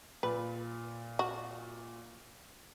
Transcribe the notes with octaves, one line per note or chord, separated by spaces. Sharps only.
A#2 B4
F#4